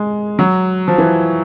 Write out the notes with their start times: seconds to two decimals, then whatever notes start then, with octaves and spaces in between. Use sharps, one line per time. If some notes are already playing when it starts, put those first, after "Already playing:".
Already playing: G#3
0.39 F#3
0.88 F3
0.98 E3